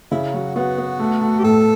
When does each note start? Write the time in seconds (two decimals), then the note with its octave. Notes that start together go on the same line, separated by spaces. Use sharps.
0.11 C#3 E4
0.33 F#3 F#4
0.56 B3 F#4
0.78 B3
0.99 A3
1.21 A3
1.39 G4
1.43 A2 A4